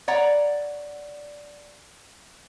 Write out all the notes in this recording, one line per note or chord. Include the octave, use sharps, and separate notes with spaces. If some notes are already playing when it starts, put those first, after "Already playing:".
C#5 D5 F#5 A#5